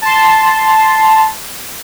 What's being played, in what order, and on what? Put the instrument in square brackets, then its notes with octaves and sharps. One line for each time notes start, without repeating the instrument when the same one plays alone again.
[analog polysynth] A5 C6